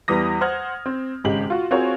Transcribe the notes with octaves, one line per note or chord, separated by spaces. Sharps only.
E2 E3 G3 D#6 A#6
C5 F#5 F6 G#6
C4
G#1 C#3 G#3 G4 F#7
F4 F#4
C4 F4 F#4 G#4 A#4 C#5